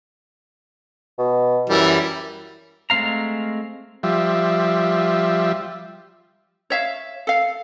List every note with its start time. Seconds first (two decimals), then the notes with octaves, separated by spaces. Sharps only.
1.18 B2
1.69 F#2 E3 G3 E4
2.90 G#3 A3 C4 F5 A#5
4.03 F3 G3 E5
6.70 C#5 E5 F5
7.27 A4 F5